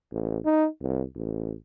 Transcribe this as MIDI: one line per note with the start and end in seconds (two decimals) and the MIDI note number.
0.12 0.38 33
0.45 0.67 63
0.81 1.03 36
1.15 1.53 33